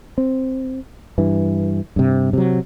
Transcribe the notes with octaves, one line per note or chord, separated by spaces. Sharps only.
C4
G2 E3
G2 C3
C3 F#3